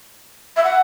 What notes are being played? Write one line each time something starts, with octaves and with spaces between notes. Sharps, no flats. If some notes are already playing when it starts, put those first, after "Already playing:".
E5
F#5